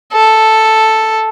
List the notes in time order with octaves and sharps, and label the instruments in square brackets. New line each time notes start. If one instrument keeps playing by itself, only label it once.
[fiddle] A4